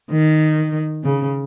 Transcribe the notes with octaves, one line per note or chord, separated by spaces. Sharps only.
D#3
C#3